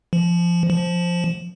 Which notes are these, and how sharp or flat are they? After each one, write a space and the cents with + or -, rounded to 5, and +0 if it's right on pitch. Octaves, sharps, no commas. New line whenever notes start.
F3 -15
F3 +0